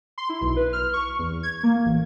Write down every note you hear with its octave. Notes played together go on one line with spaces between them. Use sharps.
C6
E4
B1
B4
F6
C#6
E2
G#6
A#3
A1